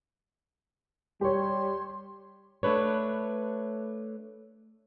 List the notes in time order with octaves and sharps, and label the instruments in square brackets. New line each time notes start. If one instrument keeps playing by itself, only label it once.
[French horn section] G3 [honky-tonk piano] G4 C#5 [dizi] C6
[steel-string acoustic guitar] A3 D4 B4 C#5